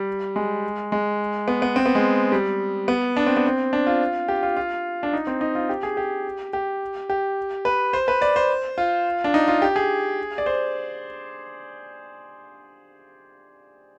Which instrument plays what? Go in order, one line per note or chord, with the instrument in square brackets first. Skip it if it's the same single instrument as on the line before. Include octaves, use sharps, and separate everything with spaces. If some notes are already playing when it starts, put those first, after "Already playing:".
Already playing: [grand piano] G3
G#3
G#3
B3
B3
C4
B3
G#3
G3
B3
D4
C4
B3
C4
D4
F4
G4
F4
F4
D4
D#4
C4
D#4
F4
G4
G#4
G4
G4
G4
B4
C5
B4
D5
C5
F4
D4
D#4
F4
G4
G#4
D5
C5